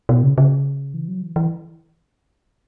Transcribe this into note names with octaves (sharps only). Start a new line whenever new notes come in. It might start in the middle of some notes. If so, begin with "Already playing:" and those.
B2
C#3
C#3
E3
F#3
E3
E3